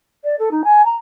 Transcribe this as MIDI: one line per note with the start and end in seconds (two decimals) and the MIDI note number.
0.24 0.36 74
0.39 0.49 69
0.51 0.62 63
0.64 0.85 80
0.85 0.96 82